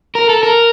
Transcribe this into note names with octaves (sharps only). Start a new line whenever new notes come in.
A#4
A4
A#4